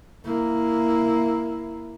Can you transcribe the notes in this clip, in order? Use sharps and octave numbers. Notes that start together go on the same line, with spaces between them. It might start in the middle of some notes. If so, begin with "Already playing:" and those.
A#3 E4